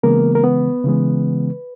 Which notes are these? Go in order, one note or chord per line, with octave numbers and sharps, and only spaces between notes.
C#3 E3 G#3 A#3 B3 A#4
A#4
B3 B4
C#3 E3 G#3 B3